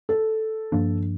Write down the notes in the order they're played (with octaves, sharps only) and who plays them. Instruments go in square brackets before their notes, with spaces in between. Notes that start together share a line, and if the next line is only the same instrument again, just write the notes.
[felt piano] A4
[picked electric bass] G2 F3 A#3 D4